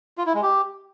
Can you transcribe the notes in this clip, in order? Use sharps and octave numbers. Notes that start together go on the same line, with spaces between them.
F4
E4
G#3
G4